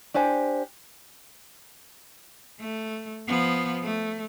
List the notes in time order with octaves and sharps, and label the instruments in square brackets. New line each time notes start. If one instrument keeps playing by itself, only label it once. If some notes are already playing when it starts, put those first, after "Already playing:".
[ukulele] D4 G4 C5 G#5
[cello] A3
F3 B3
A3